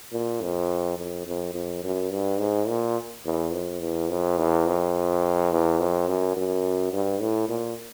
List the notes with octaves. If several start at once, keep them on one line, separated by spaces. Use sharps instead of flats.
A#2
F2
F2
F2
F2
F#2
G2
G#2
A#2
E2
F2
E2
F2
E2
F2
E2
F2
F#2
F#2
G2
A2
A#2